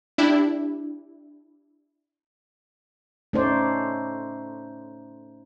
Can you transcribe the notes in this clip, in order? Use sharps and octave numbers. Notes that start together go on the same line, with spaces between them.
D4 E4 G4
A3 C#4 D#4 C5 D5